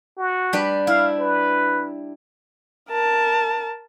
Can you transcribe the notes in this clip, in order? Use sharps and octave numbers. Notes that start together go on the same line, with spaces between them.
F#4
G3 D4 B4
E4 F5
B4
A#4 A5